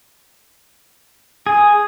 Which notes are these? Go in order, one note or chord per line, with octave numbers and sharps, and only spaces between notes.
G#4